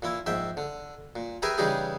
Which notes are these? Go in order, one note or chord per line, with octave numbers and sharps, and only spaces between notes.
A#2 A#3 E4
A#1 G#2 E5 G5
D3
A#2
G4 G#4 A#4 B4 E5 G#5
C#3 E3 G3 D#4 G4 G#4